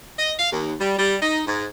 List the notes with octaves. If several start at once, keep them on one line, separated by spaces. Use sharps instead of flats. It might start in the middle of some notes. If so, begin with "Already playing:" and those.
D#5
F5
D#2
G3
G3
D#4
G#2